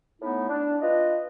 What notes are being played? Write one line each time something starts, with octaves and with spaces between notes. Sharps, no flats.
A2 A3 B3 D#4 E4
D4
F4 B4 D#5